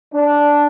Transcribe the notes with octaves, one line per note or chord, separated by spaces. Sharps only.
D4